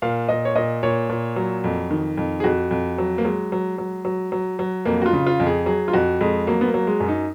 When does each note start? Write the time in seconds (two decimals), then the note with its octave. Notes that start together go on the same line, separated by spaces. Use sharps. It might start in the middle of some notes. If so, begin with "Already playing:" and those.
0.02 A#2 F5
0.29 A#2 D#5
0.45 C#5
0.55 A#2 D#5
0.83 A#2 C#5
1.09 A#2
1.36 F#3
1.64 F2
1.91 D#3
2.17 F2
2.40 G#4
2.44 F2 F#4
2.71 F2
2.98 F#3
3.18 A#3
3.24 F#3 G#3
3.52 F#3
3.78 F#3
4.05 F#3
4.32 F#3
4.59 F#3
4.85 F2 A#3
5.02 F#4
5.06 F4
5.13 C#3
5.27 F4
5.40 F2
5.46 G#4
5.66 F#3 G#4
5.88 F4
5.93 F2 F#4
6.21 F2 G#3
6.47 F#3 A#3
6.61 B3
6.68 A#3
6.74 F#3
6.87 G#3
7.00 F#2
7.08 D#4